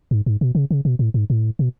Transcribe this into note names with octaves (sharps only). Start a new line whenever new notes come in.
G#2
G#2
B2
C#3
C#3
B2
A2
G#2
A2
B2